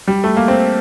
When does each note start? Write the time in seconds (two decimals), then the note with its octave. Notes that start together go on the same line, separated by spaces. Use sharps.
0.08 G3
0.24 A3
0.37 A#3
0.48 C4